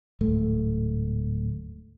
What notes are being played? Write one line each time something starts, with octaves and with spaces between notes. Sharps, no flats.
D1 G#2 A3